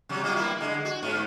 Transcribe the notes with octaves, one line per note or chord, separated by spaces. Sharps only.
C3 F#3 G3
G3 B3 F4
A#3 B3 E4
D3 G#3
F#4
G#2 B3